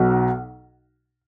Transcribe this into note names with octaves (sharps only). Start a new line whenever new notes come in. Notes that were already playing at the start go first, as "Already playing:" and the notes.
Already playing: B1 B2 F#3 D#4